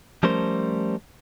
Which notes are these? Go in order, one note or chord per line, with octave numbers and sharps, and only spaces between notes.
F3 G3 A3 C#4 A#4 C5